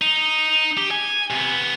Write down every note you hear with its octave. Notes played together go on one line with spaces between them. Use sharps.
D#4
G4
G#5
C3 B3